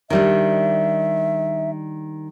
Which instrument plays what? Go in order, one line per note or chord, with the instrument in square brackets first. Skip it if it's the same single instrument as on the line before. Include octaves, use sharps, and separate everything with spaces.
[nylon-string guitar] D#3 G3 D4 [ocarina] E5